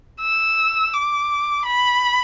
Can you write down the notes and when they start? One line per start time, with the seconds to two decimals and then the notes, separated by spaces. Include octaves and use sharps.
0.21 E6
0.93 D6
1.65 B5